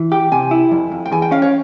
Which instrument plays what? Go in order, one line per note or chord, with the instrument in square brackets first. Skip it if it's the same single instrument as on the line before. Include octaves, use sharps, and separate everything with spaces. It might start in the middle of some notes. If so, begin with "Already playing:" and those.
Already playing: [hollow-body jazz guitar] E3
[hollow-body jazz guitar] G4 [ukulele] G5
[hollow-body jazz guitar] C3 [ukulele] G#5
[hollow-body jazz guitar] E4
F2
F2
[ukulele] G5
[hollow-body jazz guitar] E2 [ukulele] G#5
[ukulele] G5
[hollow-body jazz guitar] C#4 [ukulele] F5
[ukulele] C#5